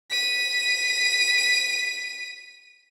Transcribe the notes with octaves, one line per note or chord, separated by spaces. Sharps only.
B6 D#7